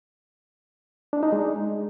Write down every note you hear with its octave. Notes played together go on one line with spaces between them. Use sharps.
D4
D#4
G#3